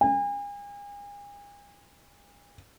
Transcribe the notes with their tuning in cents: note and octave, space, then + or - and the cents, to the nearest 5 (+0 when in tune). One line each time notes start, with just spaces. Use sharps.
G#5 -40